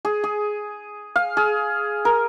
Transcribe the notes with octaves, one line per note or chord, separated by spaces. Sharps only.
G#4
G#4
F5
G#4
A#4